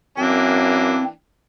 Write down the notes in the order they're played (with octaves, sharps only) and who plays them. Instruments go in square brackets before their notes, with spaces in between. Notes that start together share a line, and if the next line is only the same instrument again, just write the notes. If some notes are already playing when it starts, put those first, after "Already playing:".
[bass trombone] F#2 [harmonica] E3 A#3 D4 [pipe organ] C4